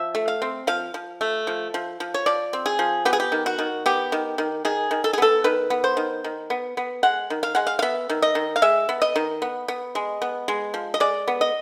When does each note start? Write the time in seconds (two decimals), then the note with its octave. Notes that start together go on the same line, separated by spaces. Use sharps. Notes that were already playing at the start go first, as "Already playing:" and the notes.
Already playing: F3 E5
0.15 A3
0.28 F5
0.42 C4
0.67 F3 F5
0.94 F3
1.21 A3
1.47 F3
1.74 F3
2.00 F3
2.14 C#5
2.26 F3 D5
2.53 C4
2.66 G#4
2.79 F3
3.05 B3 G4
3.13 G#4
3.20 G4
3.32 D#3
3.46 F#4
3.59 D#3
3.86 B3 G4
4.12 D#3
4.38 D#3
4.65 D#3 G#4
4.91 D#3
5.04 A4
5.13 G#4
5.18 B3 A4
5.44 D#3 B4
5.70 B3
5.84 C5
5.97 D#3
6.24 D#3
6.50 B3
6.77 B3
7.03 G#3 F#5
7.30 D#3
7.43 F5
7.55 G#3 F#5
7.67 F5
7.79 F5
7.82 B3 E5
8.09 D#3
8.22 D#5
8.35 D#3
8.56 F5
8.62 G#3 E5
8.89 B3
9.02 D#5
9.16 D#3
9.42 B3
9.68 B3
9.95 G#3
10.22 B3
10.48 G#3
10.74 F3
10.94 D#5
11.00 G#3 D5
11.28 B3
11.41 D#5